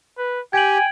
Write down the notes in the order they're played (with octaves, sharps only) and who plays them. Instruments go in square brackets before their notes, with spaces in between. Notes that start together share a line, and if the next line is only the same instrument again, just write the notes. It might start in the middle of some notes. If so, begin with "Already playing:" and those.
[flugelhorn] B4
[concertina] G4 [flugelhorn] G5 [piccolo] G#5 [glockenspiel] G#6 D7 F#7